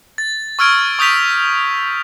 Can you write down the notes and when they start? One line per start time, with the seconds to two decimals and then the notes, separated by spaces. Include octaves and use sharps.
0.18 A6
0.59 C#6 E6 F6 G#6 D7
0.99 C#6 D#6 G6 B6 F7